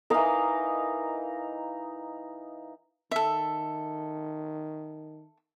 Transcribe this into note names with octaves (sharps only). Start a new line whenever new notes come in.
E3 D#4 A#4 D#5 F5
D#3 A4 E5